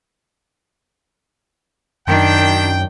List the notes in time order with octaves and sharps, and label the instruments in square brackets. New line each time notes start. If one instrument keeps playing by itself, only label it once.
[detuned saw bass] F#2 [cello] D#3 D4 [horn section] G5